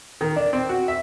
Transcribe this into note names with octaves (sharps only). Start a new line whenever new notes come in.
D#3
D4
C4
F#4
E5